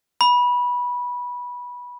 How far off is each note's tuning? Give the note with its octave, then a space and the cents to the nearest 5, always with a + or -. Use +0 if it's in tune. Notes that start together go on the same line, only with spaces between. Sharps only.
B5 -15